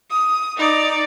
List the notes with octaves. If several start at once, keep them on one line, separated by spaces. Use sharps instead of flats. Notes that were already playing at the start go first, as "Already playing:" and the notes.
D#6
D#4 D5